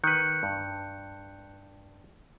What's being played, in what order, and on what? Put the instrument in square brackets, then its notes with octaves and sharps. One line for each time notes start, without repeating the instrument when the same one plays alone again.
[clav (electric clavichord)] D#3 B4 [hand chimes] F#6 G6 C#7
[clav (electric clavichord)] G2